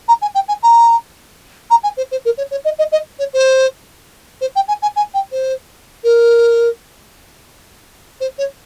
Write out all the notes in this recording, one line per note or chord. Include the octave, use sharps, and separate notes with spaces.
A#5
G#5
G5
G#5
A#5
A#5
G#5
C5
C5
A#4
C#5
C#5
D#5
D#5
D#5
C#5
C5
C5
G5
G#5
G#5
G#5
G5
C5
A#4
C5
C#5